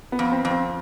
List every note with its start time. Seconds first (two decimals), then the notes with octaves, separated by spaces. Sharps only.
0.12 B3
0.19 F2
0.32 C4
0.45 F2
0.51 C4